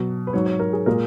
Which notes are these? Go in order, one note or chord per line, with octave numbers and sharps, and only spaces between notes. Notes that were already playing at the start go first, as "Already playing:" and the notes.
Already playing: B2 F#3
B4
G#2 F#3 C#5
C#5
A#4
G#4
A#2 G#3 A#4